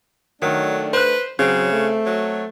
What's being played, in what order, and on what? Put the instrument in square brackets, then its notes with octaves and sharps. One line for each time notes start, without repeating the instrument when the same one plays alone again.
[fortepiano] D#3 [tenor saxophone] F#3 [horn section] A3 D4
[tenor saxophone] B4 [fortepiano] C5 F#6
[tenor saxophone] C#3 [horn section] F#3 [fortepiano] C4
[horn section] A3
[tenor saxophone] F#3